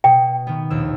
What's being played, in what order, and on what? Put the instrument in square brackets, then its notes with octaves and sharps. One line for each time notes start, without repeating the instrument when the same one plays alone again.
[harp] B2 [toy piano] G5
[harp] D#3 B3
A#1 D#2 E6